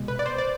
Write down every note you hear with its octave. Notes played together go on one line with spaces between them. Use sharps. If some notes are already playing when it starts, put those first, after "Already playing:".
Already playing: C2 B2 G#3
B4
D5
C5
D5